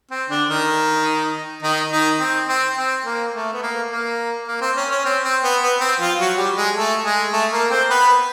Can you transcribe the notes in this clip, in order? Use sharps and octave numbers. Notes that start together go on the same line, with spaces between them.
C4
D3 D4
D#3 D#4
D#3 D#4
D#3 D#4
C4
C4
C4
A#3
A3
B3
A#3
A#3
A#3
C4
C#4
C#4
C4
C4
B3
B3
C4
F3 F4
F#3 F#4
G3 G4
G#3 G#4
A3 A4
G#3 G#4
A3 A4
A#3 A#4
C4 C5
B3 B4